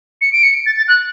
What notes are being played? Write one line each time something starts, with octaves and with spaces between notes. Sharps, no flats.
C#7
D7
C#7
A6
A6
F#6